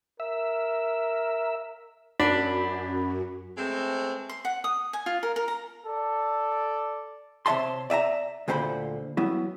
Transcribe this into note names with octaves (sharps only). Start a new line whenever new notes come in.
A#4 E5
F#2 D4 B5
G#3 A3 B3 C4
C6
F#5
D#6
G#5
F4
A#4
A#4
A#5
A4 D5
C3 C#5 E5 A5 C6
D5 E5 G#5 A#5
D2 A#2 D3 C5 A#5 B5
F#3 B3 E4